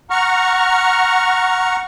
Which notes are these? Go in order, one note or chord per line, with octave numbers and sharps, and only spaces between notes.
F#5 A#5 C#6 F6